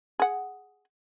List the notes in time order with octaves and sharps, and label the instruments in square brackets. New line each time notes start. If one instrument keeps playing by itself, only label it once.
[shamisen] G#4 F#5